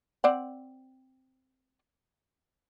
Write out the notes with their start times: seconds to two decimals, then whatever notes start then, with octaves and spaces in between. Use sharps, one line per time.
0.24 C4 D5 F#5